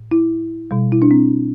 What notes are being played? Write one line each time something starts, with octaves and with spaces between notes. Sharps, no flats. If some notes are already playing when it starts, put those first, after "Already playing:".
Already playing: A2
E4
B2 G3
E4
D4
C4